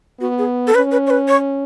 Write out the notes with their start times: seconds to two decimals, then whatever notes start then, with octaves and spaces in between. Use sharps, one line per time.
0.20 B3 F#4
0.38 G#4
0.67 A4
0.75 C#4 B4
0.92 B4
1.07 C#5
1.10 B4
1.28 C#5